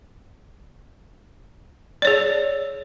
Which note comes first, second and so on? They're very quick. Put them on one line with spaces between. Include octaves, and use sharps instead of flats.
D5 C#5 G#4